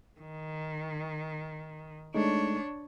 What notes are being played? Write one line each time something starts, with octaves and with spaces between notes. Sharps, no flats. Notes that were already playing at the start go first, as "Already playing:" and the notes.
D#3
G#3 A3 D4 D#4 C#5